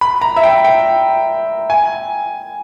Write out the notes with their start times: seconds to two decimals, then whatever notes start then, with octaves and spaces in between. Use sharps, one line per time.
0.01 B5
0.21 A#5
0.36 E5
0.43 G5
0.64 G5
1.70 G#5